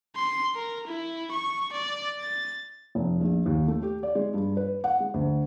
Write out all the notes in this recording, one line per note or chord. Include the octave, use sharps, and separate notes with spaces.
C6
A#4
E4
C#6
D5
A6
F1
A#1
D#2
A3
G4
D5
G#3
G2
B4
F#5
G#3
D2